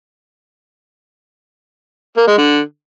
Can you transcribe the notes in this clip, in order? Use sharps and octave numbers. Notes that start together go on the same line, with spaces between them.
A#3
G#3
D3